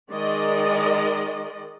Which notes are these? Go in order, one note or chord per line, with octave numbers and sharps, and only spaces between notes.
D#3 G#3 D5 D#5